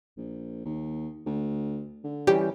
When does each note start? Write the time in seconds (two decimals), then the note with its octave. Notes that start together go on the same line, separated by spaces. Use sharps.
0.18 A#1
0.65 D#2
1.26 D2
2.04 D3
2.27 E3 G3 C#4 G4